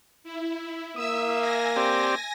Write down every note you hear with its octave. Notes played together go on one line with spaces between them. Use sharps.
E4
A#3 E5 D#6 E6
G#5 A#6
C4 G4 D5